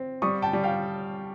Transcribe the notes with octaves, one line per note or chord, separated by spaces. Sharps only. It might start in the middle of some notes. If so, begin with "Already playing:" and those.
Already playing: C4
G3 C#6 D#6
G5 A5
G3
F5 G5